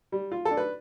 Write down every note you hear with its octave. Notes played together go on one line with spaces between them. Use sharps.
G3
F4
A4
D4
B4